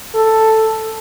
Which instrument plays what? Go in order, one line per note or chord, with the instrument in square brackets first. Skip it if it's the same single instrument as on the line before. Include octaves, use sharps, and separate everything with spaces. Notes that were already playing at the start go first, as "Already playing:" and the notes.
[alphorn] A4